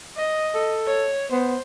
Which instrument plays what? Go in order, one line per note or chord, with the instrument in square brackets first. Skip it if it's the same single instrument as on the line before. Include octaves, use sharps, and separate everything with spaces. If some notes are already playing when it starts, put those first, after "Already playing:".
[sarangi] D#5
[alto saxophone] A4
[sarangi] C#5
[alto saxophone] B3 [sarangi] C5